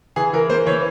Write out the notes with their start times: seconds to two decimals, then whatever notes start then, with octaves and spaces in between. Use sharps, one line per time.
0.16 E3 G#4
0.33 E3 A#4
0.50 A#3 C5
0.66 E3 C#5